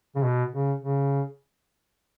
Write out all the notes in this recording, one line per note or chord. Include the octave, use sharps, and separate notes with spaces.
C#3
B2
C#3
C#3